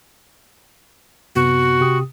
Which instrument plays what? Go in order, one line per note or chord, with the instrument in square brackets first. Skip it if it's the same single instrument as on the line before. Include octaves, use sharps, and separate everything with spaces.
[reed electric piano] F#2 C3 B3 [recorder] F#4
[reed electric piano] C3 G4 D#6